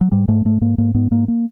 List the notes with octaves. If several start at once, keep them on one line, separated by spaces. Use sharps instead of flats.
F#3
G#2 G3
G#2 A3
G#2 A3
G#2 A#3
G#2 A#3
G#2 B3
G#2 A#3
A#3